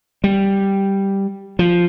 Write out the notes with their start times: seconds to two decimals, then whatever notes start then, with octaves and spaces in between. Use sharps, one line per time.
0.24 G3
1.59 F3